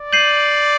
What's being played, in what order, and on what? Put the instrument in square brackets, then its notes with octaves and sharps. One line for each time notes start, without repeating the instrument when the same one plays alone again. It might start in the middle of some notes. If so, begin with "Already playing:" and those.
Already playing: [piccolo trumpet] D5
[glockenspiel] G6 C7 D#7 F#7